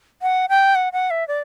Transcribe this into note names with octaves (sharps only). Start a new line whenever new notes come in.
F#5
G5
F#5
F#5
E5
D5